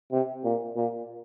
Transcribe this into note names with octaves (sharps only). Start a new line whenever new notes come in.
C3
A#2
A#2